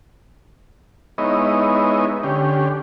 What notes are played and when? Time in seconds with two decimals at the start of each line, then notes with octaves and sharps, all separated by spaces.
1.18 G#3 B3 D#4 E4 C#5 D#5
2.23 D3 C#4 G4